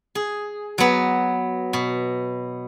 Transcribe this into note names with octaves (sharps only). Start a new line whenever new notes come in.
G#4
F#3 B3
B2